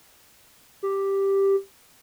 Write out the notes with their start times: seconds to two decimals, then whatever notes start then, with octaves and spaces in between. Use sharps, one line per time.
0.83 G4